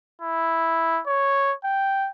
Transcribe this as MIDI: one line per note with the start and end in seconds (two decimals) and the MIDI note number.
0.22 1.01 64
1.07 1.54 73
1.64 2.09 79